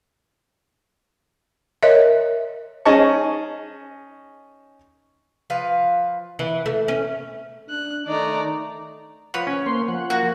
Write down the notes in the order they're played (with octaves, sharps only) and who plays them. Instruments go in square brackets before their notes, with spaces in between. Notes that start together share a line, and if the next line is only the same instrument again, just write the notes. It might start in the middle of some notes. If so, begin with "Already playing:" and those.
[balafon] A#4 C#5 D#5 E5
[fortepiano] C#4 D#4 G#4 D#5 A5 C#6
[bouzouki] F3 B4 F5
[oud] E3
A3
C#4
[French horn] D4 [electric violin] F#6
[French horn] D#3 [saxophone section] A3 D4 D#4 [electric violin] D5 A#5
[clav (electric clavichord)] F3 B4 F#5 [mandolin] C#5
[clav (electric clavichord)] C#4
[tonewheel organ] A#3 C5 C6
F3 F#5
[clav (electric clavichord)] A#3 [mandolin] F#4